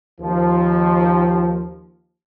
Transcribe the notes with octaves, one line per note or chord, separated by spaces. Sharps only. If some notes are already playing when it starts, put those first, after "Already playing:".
D#2 F3